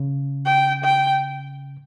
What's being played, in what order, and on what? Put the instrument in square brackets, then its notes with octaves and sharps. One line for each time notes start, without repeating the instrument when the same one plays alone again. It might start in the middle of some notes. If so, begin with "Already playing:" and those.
Already playing: [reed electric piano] C#3
[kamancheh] G5
G5